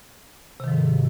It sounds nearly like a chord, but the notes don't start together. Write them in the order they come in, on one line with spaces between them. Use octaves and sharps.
C3 D#3 F3 G#2